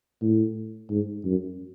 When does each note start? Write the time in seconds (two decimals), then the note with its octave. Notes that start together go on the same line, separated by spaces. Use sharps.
0.22 A2
0.90 G#2
1.25 F#2